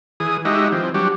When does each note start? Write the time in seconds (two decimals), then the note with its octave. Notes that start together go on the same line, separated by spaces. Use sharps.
0.20 E3 G#4 D#6
0.45 G#3 D#4 F#4 G4 D#5 E5
0.72 E3 F3 C4
0.94 F#3 G3 D4 F#4 G4